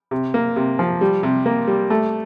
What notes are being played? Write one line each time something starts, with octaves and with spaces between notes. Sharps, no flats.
C3
A#3
C3
F3
G3
C3
A#3
G3
A3